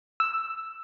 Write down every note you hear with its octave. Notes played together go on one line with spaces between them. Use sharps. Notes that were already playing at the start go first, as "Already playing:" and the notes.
E6